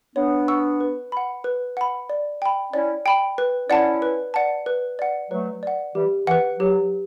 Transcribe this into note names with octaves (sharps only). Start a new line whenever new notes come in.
B3 D4 C#5
F#5 C#6 E6
B4
F#5 B5
B4
F#5 B5
D5
G5 B5
C#4 E4 D5
G5 B5
B4
C#4 E4 D5 F#5 A5
B4
D5 F#5 A5
B4
D5 F#5
F#3 A3 B4
D5 F#5
E3 G3 G4
E3 B4 F#5
F#3 G4